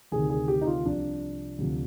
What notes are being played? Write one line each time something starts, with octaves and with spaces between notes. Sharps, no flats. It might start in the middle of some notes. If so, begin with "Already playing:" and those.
D2 C3 D#3 G#4
G#4
G4
D#4
F4
C2 C3 F3 D4
D2 C3 F3